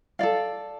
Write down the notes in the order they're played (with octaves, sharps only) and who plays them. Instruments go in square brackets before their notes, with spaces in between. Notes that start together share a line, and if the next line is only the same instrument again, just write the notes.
[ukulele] A4 D5 F5